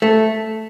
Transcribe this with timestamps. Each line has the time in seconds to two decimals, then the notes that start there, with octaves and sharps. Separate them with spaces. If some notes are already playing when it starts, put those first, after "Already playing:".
0.02 A3